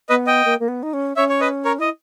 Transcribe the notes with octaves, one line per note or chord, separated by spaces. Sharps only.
B3 B4 D#5
D#5 G5
A#3
A#3
B3
D#4
C#4
C#4 C#5 E5
C#5
B4 D#5
A#4 C#5
E4 D#5